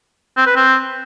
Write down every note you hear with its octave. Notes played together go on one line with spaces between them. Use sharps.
C4
B4
C4